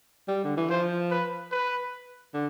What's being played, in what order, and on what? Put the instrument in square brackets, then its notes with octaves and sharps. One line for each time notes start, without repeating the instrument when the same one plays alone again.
[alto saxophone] G3
D3
E3
[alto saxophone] F3 [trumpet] C5
[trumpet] B4
B4
[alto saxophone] D3